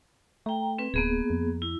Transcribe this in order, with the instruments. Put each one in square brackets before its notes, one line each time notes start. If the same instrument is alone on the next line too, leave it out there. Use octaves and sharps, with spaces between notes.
[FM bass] A3 [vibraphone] G5 A#5
[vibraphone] C4 B4
[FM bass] D1 [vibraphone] A#3 B3 G#4
[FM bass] F2
[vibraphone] E4